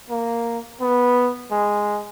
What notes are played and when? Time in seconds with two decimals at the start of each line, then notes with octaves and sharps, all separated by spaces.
0.10 A#3
0.81 B3
1.51 G#3